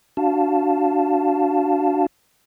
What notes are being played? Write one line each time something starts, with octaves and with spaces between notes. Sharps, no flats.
D4 F#4 F5 A5